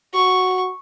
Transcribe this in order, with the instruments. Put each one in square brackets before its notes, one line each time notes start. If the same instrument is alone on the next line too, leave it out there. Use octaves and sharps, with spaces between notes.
[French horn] F#4 [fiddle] C#6